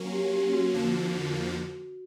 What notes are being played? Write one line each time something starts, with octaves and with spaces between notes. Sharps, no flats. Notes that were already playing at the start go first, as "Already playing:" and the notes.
Already playing: F#3 A#3 C#4
G4
G4
F#4
F2 D3 F3 A#3